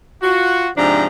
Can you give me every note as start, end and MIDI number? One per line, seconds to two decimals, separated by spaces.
0.22 0.69 65
0.22 0.69 66
0.77 1.07 44
0.77 1.07 48
0.77 1.07 53
0.77 1.07 62
0.77 1.07 82